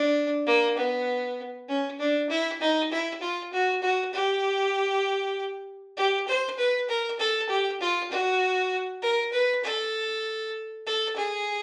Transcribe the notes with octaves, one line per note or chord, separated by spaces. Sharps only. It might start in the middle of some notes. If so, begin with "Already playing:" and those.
Already playing: D4
A#3
B3
C#4
D4
E4
D#4
E4
F4
F#4
F#4
G4
G4
C5
B4
A#4
A4
G4
F4
F#4
A#4
B4
A4
A4
G#4